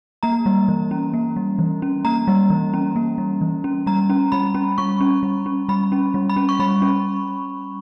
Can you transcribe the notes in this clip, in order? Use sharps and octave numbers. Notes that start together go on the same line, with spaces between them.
A#3 A#5
G3
E3
C#4
A#3
G3
E3
C#4
A#3 A#5
G3
E3
C#4
A#3
G3
E3
C#4
G3 A#5
C#4
G3 B5
C#4
G3 C#6
C#4
G3
C#4
G3 B5
C#4
G3
B5
C#4
C#6
G3 B5
C#4